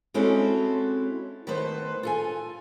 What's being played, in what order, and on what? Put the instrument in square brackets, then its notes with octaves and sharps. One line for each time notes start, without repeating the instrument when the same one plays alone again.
[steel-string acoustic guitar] G#3 C4 C#4 E4 F#4 A4
D#3 A3 B3 B4 C5
F4 A4 G#5